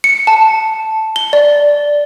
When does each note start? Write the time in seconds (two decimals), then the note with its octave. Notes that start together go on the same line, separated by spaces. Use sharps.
0.04 C#7
0.27 A5
1.16 G7
1.33 D5